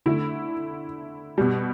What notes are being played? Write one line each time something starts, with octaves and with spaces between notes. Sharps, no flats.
D3 A3 E4
B2 G3